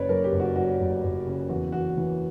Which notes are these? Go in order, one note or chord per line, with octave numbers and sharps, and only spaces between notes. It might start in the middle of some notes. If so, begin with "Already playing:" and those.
Already playing: F#1 C#3 B4 C#5 D5
F#2 A#4
G4
F#1
F#4
F#2 F#4
F#1
F#1
C#3
E2 F#4
E2 F#4
E3